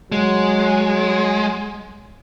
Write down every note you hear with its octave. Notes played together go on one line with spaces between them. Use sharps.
F#3 G#3